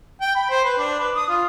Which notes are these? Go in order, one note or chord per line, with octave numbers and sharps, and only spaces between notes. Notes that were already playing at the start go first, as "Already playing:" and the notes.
G5
B5
C5
B4
D4
B4
D#6
F4